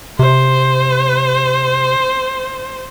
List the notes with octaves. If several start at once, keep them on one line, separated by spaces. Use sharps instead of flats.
C3 C5